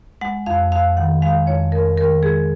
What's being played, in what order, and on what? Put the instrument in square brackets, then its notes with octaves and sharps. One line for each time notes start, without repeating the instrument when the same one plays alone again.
[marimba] G#3 F#5
F2 F5
F2 F5
D#3 F#5
G#3 F5
F2 C#5
F2 A#4
D#3 A#4
G#3 G#4